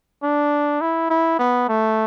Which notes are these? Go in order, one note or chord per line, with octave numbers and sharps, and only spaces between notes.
D4
E4
E4
B3
A3